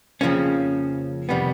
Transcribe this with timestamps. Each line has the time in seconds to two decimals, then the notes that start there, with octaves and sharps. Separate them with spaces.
0.21 F2 C#3 F3 A#3 C#4
1.29 C3 D#3 G3 B3